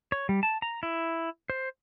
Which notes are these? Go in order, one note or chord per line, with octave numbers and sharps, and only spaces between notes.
C#5
G3
A5
A#5
E4
C5